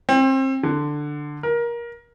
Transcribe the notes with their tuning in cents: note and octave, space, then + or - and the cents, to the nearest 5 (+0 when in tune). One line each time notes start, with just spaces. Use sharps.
C4 +30
D3 +10
A#4 +20